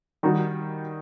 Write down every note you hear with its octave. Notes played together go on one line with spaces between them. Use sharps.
D#3 G3 D#4 F#4